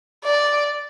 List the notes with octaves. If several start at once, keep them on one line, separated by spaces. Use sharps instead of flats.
D5